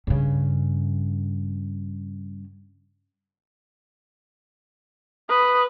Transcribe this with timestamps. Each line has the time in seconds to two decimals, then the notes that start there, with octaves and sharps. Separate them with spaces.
0.07 G2 C#3
5.29 B4 D#6